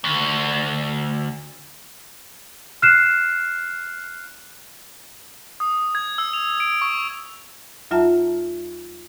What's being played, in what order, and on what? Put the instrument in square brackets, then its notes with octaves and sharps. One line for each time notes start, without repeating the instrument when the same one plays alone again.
[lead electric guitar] D2
[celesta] F6 F#6 C7 E7
[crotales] D#6
G#6
E6
F7
D7
C#6
[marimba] D#2 F#3 F4 E5 A5 A#5